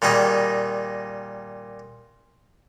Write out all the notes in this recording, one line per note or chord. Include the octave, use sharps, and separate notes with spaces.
A#2 D#3 G3 D#4 G#4